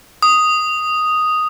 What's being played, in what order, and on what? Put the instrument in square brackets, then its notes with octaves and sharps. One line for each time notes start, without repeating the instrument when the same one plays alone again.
[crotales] D#6